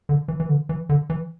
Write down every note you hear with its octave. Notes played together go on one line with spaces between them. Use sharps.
D3
E3
E3
D3
E3
D3
E3